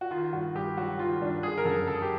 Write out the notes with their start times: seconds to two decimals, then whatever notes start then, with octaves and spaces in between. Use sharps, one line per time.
0.01 F#4
0.11 D#3 F4
0.33 G2 F#4
0.55 G2 G4
0.77 F#3 F#4
0.99 D#3 F4
1.21 G2 D4
1.43 D3 G#4
1.58 A#4
1.65 F#2 A4
1.87 F#2 A4
1.95 G#4
2.02 G4